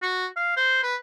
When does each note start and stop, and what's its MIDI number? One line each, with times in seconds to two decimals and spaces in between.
0.02 0.26 66
0.36 0.56 77
0.57 0.81 72
0.83 0.96 71